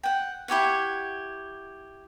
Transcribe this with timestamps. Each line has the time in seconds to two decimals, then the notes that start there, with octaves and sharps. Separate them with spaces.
0.03 F#5 G5
0.48 E4 G4 C#5 F#5